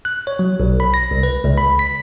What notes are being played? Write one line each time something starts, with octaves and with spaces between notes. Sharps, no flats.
F#6
C#5
F#3
B1
B5
A#6
C2
B4
C#2
B5
B6